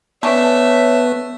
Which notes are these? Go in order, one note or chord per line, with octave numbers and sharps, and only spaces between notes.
A3 B3 C#4 D4 B4 C#5 E5